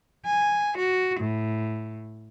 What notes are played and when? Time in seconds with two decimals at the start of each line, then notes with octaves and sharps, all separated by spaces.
0.24 G#5
0.78 F#4
1.19 A2